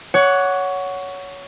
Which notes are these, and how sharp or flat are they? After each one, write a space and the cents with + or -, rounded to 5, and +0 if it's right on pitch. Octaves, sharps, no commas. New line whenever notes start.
C#5 +15 F#5 +0 D6 -15